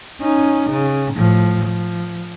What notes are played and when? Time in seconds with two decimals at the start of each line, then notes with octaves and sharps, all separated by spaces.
0.21 C#4 D#4
0.70 C#3
1.14 A2 F3
1.64 F3